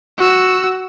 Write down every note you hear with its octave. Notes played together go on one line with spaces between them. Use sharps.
F#4 E6